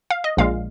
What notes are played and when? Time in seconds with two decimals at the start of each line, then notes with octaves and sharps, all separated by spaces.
0.10 F5
0.24 D#5
0.37 A#1 A#2 G#3 F5